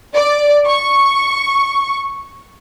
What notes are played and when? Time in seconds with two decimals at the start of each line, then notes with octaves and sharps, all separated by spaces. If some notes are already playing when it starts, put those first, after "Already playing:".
0.14 D5
0.67 C#6